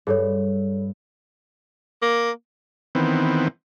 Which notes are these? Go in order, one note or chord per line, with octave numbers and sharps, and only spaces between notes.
G2 G#4 A4 C#5
A#3
D#3 E3 B3 C4